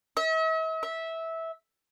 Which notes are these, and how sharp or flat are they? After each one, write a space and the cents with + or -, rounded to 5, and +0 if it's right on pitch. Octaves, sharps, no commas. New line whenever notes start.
E5 -45
E5 -15